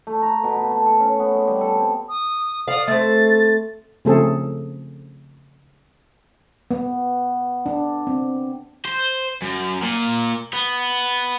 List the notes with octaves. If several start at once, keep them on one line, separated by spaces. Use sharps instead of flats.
A3
A#5
B2
A3
A5
A4
C#4
B3
G#3
G3
A4
C4
D#6
D5 F5 D#6
A3 C4 A6
C#3 F3 A3 C4 G#4 A4
B3
D4
C4
C5
F#2
A#2
B3